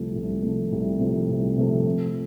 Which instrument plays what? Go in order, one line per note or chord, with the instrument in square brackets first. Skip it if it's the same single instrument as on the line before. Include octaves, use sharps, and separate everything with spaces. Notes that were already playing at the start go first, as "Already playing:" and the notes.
Already playing: [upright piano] C2 C3 F3 A3
C2
C3 F3 A3
C2
C3 F3 A3
C2
C3 F3 A3
F3